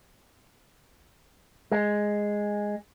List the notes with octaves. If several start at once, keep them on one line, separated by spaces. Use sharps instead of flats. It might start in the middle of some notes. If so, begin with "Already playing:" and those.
G#3